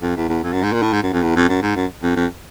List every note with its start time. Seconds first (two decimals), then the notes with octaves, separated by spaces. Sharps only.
0.02 F2
0.17 E2
0.29 E2
0.43 F2
0.53 F#2
0.63 G#2
0.73 A#2
0.82 A2
0.93 G#2
1.03 F#2
1.13 F2
1.22 E2
1.36 F2
1.49 F#2
1.62 G#2
1.76 F#2
2.03 F2
2.16 F2